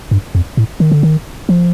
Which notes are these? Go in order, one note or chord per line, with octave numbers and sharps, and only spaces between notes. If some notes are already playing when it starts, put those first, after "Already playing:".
G2
F2
A2
D#3
D3
D#3
F3